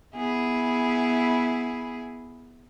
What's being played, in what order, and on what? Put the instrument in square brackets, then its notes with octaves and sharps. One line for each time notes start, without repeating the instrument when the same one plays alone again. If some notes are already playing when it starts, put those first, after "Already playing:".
[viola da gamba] B3 E4 G#4